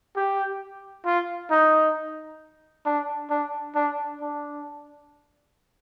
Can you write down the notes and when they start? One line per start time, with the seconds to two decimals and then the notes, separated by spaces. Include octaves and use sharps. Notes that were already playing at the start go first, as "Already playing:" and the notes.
0.16 G4
1.05 F4
1.51 D#4
2.85 D4
3.30 D4
3.75 D4
4.21 D4